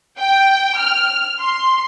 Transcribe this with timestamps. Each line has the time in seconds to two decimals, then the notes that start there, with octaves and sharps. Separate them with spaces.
0.18 G5
0.77 F6
1.41 C6